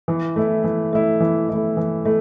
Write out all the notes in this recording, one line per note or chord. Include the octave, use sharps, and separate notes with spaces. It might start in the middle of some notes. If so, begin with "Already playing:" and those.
E3
A3 E4
E3
A3 E4
E3
A3 E4
E3
A3 E4